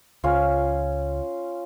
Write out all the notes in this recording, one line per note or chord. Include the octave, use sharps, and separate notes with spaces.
C#2 C#4 F4